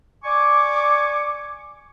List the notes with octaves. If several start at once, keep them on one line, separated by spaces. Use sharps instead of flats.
D5 G#5 C#6 D6